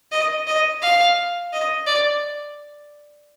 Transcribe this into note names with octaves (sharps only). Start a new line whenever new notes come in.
D#5
D#5
F5
D#5
D5